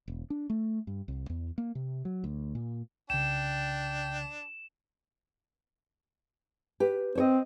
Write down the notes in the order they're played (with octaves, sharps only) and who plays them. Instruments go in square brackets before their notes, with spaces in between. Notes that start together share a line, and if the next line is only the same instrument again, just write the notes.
[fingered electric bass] E1
D4
A3
G2
C2
E2
A#3
C3
F#3
D2
A#2
[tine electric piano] C2 C#3 [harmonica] D4 [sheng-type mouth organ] G5 [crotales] E7
[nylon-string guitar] G4 B4
[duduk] C4 [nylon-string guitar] C5 C#5 D#5